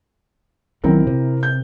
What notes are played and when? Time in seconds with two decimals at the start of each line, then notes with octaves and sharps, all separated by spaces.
0.84 B1 D#3 F#3 C4 E4 A#4
1.07 C3
1.43 G6